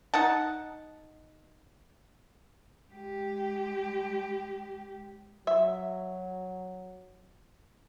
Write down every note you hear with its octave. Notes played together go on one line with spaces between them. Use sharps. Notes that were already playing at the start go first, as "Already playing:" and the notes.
D#4 F#5 A5
G#3 G4
F#3 E5